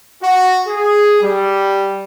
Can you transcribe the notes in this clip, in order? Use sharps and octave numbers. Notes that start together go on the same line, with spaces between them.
F#4
G#4
G3